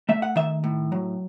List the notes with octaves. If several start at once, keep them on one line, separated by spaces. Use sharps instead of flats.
A3 E5
F#5
D#3 E5
A2
F#3